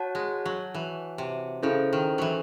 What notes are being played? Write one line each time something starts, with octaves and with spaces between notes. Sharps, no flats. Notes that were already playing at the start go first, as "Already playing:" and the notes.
Already playing: F#4 C#5 F#5 A5
G#3
F#3
E3
C3
C#3 C#4 E4 A4 C5
D#3
E3 F#3